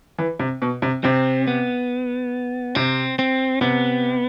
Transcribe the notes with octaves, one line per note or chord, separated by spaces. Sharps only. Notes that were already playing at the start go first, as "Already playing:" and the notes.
E3
C3
B2
C3
C3 C4
B3
C3 C4
C4
C3 B3